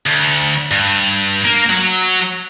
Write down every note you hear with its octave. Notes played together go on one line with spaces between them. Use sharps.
D2
G2
A#3
F#3